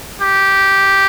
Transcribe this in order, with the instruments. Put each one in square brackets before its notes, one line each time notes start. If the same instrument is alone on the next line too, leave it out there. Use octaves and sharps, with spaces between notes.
[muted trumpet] G4